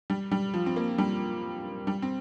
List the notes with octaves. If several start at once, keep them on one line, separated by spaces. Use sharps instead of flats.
G3
G3
F3
C4
A#3
G3
G3
C4